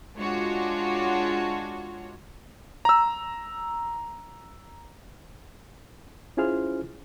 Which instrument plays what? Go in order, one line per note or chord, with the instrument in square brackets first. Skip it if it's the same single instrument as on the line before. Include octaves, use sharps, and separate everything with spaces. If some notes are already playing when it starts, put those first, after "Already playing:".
[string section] G#3 D4 F4 F#4 C#5
[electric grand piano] A#5 E6
[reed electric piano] C#4 E4 F4 G#4 C5 F6